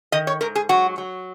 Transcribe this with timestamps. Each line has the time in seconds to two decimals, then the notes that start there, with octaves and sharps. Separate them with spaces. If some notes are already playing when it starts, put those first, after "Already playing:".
0.12 D#3 D#5
0.27 C#5
0.41 G#2 A#4
0.55 G#4
0.69 F#3 F#4
0.98 F#3